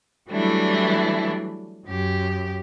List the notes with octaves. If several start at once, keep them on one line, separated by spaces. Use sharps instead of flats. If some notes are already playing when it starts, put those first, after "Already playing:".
E3 F#3 G3 A3 D4 E4
F#2 G4